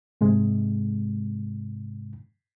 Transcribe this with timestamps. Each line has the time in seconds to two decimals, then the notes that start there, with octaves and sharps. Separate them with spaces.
0.21 G#2 C3 G#3